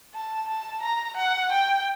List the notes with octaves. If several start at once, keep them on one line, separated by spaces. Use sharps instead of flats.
A5
A5
A#5
F#5
G5